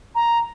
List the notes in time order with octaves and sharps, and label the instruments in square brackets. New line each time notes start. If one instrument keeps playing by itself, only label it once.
[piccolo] A#5